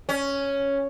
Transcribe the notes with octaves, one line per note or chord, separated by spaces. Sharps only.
C#4